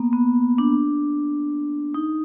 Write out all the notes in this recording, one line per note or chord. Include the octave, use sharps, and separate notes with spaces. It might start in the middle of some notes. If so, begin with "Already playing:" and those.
Already playing: A#3 B3
B3
D4
D#4